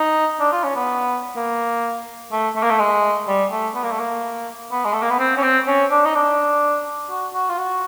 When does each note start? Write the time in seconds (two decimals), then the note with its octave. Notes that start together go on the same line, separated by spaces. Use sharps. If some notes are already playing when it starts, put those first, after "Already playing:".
Already playing: D#4
0.40 D4
0.52 F4
0.64 C#4
0.76 B3
1.36 A#3
2.32 A3
2.56 A3
2.63 A#3
2.70 A3
2.80 G#3
3.28 G3
3.52 A3
3.75 B3
3.84 A#3
3.91 A3
4.00 A#3
4.72 B3
4.85 G#3
4.93 A3
5.02 A#3
5.11 B3
5.19 C4
5.37 C#4
5.43 C4
5.68 C#4
5.91 D4
6.05 D#4
6.15 D4
7.10 F#4
7.34 F#4
7.49 F4
7.58 F#4